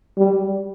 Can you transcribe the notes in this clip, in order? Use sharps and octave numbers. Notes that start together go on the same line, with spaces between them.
G3